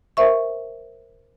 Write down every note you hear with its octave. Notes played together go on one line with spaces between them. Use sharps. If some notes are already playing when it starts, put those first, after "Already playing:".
A#4 C5 E5 C#6